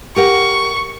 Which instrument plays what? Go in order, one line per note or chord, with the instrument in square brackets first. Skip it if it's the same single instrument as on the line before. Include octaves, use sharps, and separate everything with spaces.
[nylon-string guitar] G4 A#4 F#5 [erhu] C#6